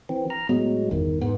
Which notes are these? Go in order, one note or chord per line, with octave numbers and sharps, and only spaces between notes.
E3 C4
A#5 F6
A2 F#3 G#3 B3
G1 E2 D#3
G#2 B3